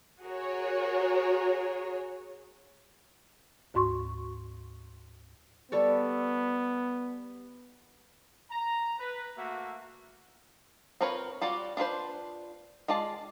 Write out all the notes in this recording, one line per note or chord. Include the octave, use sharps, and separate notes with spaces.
F#4 G#4 A#4 C#5
D2 G#2 F#4 C6 C#6
G3 B3 A4 C#5
A#5
B4
A3 A#3 F#4 E5
C4 F4 A#4 B4 C#5
G3 F4 F#4 D5
D4 F4 B4 C5
G#3 F4 D5 A5